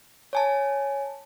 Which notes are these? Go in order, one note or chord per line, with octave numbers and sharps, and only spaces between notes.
C#5 G#5 A5